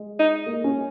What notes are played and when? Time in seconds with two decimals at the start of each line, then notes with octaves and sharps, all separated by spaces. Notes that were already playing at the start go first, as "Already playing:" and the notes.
Already playing: G#3
0.19 D#4
0.46 A#3
0.64 C#4